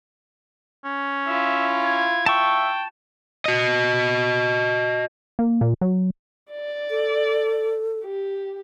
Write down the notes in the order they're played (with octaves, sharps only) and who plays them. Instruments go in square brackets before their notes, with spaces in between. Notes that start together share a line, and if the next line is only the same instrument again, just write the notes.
[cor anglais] C#4
[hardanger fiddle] E4 F4 [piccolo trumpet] E5
[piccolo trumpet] G#6
[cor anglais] E5 [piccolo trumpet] G5 [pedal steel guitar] A5 C#6
[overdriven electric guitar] F#4 D#5
[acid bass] A#3
A#2
F#3
[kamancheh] D5
[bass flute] A4
[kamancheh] G4